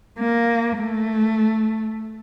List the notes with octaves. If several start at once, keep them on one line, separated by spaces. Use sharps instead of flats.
A#3
A3